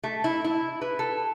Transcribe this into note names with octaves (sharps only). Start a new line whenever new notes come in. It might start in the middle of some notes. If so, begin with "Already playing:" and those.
A3
E4
E4
B4
A4